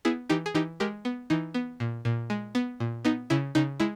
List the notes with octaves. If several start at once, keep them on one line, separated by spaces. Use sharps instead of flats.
B3 E4 G#4
E3 D#4 G4
G#4
E3 D#4 G4
G#3 G4 A#4
B3
E3 D#4
B3
A#2
A#2
G#3
B3
A#2
B3 D#4
C#3 E4
C#3 D#4
G#3 E4